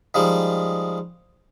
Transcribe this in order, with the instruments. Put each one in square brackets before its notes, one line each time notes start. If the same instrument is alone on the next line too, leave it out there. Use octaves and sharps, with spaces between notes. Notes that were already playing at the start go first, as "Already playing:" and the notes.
[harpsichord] D#3 F3 G3 G#3